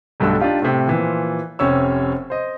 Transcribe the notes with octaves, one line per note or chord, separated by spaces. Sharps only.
B1 G2 D3 A3 E6
D4 D#4 F4 G4
A2 C3
A#2 E3 F3
F1 C3 C#4 C#5 E6
C5 D#5